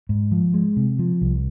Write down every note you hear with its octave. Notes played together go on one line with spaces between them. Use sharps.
G#2
F3
G#3
C3
F3
C2